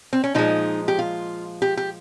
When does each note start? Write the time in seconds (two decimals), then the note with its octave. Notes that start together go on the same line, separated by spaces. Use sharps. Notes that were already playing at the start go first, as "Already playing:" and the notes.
0.13 C4
0.24 C#4
0.34 A#2 F3 G#3 D#4
0.88 G4
0.99 F4
1.62 G4
1.77 G4